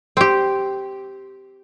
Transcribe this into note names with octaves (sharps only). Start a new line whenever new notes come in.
C4 G4